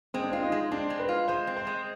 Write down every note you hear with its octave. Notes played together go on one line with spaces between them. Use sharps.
G#3 C4
D4
C4 F4
D#4
G#3
C4 D4
G#3
B4
F4
G#3 C5
C4
C5
G#3